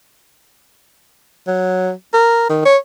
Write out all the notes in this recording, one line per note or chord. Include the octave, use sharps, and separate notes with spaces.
F#3
A#4
D#3
C#5